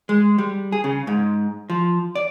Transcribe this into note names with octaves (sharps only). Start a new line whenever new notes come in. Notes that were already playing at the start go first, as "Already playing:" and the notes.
G#3
G3
G#4
C#3
G#2
F3
D5